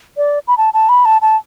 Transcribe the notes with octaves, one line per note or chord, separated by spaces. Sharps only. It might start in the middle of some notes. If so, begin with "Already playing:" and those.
D5
B5
A5
A5
B5
A5
A5